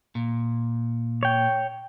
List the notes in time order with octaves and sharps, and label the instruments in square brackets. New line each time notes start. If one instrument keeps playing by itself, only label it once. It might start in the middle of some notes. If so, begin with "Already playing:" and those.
[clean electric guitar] A#2
[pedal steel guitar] C#5 G5